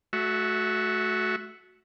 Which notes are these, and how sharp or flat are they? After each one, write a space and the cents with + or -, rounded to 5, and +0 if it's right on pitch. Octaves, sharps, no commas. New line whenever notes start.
A3 -25 F#4 +0 E5 +0